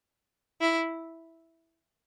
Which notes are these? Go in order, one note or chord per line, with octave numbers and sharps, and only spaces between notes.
E4